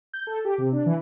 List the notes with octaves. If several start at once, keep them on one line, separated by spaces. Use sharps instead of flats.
G6
A4
G4
C3
D4
E3